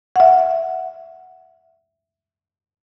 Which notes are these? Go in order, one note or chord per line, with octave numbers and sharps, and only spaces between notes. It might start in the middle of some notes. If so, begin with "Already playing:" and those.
E5 F#5